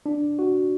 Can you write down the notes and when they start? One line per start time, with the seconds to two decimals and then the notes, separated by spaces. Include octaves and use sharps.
0.06 D4
0.39 F#4